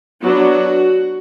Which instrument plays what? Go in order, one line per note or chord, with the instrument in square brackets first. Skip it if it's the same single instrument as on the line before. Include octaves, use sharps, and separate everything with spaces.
[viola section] F#3 B3 D4 F#4